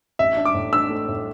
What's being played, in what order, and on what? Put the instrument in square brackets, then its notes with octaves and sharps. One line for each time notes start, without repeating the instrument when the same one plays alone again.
[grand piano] A1 E5
D4
D6
A2
D4 E6
A3
A2